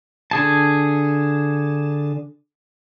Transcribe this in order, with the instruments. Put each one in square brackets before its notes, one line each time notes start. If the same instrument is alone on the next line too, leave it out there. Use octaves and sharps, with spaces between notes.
[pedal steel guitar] D3 G#4 A5